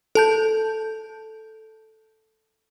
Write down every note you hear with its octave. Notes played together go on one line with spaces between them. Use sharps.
A4 A5 G6